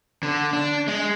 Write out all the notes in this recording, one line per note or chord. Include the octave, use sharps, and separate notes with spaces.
D3
D4
G#3